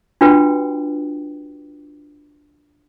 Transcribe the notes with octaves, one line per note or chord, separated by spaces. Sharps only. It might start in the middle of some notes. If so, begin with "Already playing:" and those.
D4 F4 F#4 B4 G5